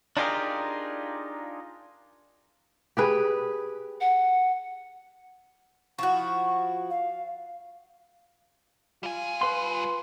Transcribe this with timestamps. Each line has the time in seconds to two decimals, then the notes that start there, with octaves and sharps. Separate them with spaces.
0.17 D4 D#4 F4 G4 G#4 A#4
2.97 G4 G#4 B4
4.01 F#5
5.99 F3 E4 F#4 C#6
6.90 F5
9.03 G3 F4 G#5
9.41 B4 C6